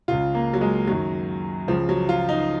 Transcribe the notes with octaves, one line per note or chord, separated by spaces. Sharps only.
C#2 C#3 F4
A#3
F#3
G#3
F#2 D#3 F#3
C#2 C#3 F3
F#3
F4
D#4